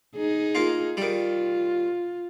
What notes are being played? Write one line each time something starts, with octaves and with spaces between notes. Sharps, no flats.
D#4 G#4
A#3 F4
D#3 G3 F4